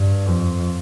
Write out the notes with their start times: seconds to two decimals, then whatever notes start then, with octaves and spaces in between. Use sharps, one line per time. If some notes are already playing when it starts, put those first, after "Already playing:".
Already playing: G2
0.26 F2